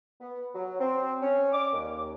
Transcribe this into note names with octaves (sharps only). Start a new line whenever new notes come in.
B3
F#3
C4
C#4
D6
D#2